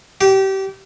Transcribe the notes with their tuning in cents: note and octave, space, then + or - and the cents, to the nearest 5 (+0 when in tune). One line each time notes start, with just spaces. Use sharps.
G4 -25